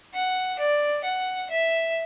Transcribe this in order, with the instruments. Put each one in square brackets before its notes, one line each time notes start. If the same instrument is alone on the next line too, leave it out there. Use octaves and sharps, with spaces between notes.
[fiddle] F#5
D5
F#5
E5